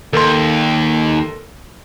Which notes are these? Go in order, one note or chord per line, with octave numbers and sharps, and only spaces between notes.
D#2 A4 A#4 C6